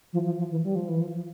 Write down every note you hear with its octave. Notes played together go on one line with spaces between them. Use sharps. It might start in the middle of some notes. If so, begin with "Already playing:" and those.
F3
F3
F3
E3
G3
F3
E3
F3
F3